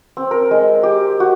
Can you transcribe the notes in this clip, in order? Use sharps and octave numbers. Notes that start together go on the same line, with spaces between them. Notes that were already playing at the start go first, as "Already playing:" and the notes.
C4
A#4
G#3
G4
F#4